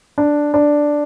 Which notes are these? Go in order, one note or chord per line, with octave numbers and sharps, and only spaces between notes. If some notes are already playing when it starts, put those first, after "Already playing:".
D4
D4